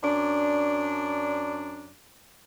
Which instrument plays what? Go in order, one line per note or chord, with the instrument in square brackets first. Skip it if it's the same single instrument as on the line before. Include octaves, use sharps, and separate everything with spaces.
[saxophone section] F#2 D4